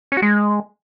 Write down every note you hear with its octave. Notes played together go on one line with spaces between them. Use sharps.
C#4
F#4
G#3